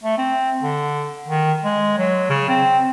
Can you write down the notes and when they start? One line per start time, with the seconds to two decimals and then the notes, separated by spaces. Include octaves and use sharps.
0.03 A3
0.18 C4
0.63 D3
1.28 D#3
1.64 G#3
1.98 F#3
2.30 C#3
2.49 C4